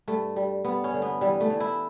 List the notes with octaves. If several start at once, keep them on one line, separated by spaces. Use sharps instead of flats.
G2 A3
G3
G2 B3
C#4
D3
B3
E3 G3
A3
E3
E4